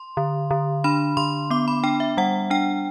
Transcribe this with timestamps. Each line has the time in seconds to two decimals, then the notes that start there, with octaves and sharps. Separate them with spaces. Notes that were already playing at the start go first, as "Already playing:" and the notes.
Already playing: C6
0.17 D3
0.51 D3
0.84 D4 B5
1.17 D3 C6
1.50 B3 D6
1.68 B5
1.83 D4 G5
2.00 E5
2.17 G3 F#5
2.50 D4 G5